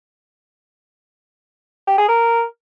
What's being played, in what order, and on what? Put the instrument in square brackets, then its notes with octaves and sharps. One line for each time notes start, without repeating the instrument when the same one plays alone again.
[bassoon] G4
G#4
A#4